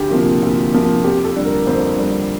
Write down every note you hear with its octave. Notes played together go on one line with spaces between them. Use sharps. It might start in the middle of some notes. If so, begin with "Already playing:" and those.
Already playing: D2 G4
C3 F3 A#3
D2 F4
C3 F3 A#3
F2 G4
A4
D3 G3 D4
A#4
F2 C5
D3 G3 D4